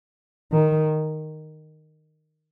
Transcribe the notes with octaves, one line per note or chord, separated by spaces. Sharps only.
D#3